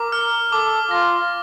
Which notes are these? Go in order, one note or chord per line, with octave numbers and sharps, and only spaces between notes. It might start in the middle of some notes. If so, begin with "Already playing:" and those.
Already playing: A#4 D6
F6
A4 D6
F4 A#6